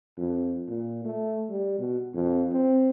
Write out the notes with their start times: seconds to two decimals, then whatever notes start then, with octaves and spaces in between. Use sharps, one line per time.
0.18 F2
0.68 A#2
1.04 A3
1.50 G3
1.79 B2
2.14 F2
2.52 C4